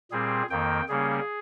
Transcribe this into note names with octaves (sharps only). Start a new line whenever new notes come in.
A#2 G3 C4 G#4
F2 D#3 A#3 G5
C#3 G3 A#3 C#4 G#4